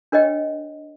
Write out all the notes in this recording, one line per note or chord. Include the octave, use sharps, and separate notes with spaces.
D4 A#4 C#5 D#5 G5